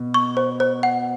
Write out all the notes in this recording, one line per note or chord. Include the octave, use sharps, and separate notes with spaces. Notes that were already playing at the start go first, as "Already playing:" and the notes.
Already playing: B2
C#6
C5
C5
F#5